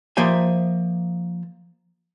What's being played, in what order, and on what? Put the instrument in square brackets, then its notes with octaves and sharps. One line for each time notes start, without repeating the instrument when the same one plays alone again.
[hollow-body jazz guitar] F3 A#3 C5 E5 G#5